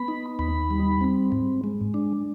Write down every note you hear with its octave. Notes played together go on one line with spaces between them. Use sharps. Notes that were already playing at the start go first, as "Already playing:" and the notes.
Already playing: B3 B5
D#4
D#2 B5
G3
C4
G#2
G#3
D4